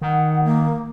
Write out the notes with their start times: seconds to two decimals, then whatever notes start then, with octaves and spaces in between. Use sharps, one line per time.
0.01 D#3 F#5
0.45 A#3